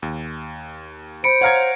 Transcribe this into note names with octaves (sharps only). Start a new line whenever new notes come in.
D#2
C5 B5 C#7 D7
C#5 F5 F#5 A#5 F6 G#6